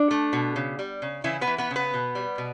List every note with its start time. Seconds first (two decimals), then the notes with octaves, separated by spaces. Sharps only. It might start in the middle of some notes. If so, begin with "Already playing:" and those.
Already playing: D4
0.11 A3
0.33 B2
0.56 C#3
0.79 G3
1.02 C#3
1.24 C#3 E3 E4
1.41 B3 B4
1.47 E3
1.58 B3 B4
1.71 C#3
1.76 B3 B4
1.94 B2
2.15 G3
2.38 B2